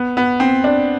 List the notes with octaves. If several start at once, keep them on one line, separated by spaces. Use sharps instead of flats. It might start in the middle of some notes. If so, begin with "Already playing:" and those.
Already playing: B3
B3
C4
D4